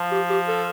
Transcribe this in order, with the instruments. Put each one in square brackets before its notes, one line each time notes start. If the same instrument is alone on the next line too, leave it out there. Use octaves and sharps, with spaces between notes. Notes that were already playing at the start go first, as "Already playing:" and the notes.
Already playing: [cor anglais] F3
[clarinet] G4
G4
A4